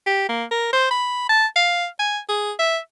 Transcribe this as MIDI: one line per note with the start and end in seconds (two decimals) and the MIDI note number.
0.07 0.29 67
0.29 0.44 58
0.51 0.69 70
0.73 0.90 72
0.91 1.29 83
1.29 1.46 81
1.56 1.87 77
1.99 2.19 80
2.29 2.52 68
2.59 2.78 76